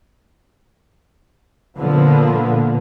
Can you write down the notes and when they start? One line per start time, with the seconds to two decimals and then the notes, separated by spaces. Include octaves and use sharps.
1.77 A#2 D3 F3 A#3 B3